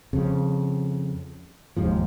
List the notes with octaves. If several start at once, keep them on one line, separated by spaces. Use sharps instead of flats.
F2 C#3
F1 D#2 G#2 F3